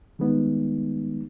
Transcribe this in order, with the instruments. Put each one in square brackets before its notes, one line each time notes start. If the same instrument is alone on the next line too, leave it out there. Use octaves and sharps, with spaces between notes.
[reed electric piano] D#3 G3 G#3 B3 D#4